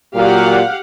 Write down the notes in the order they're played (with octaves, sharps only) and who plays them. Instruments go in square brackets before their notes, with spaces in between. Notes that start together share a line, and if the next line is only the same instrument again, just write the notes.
[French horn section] A#2 F#3 [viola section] G4 F5 F#5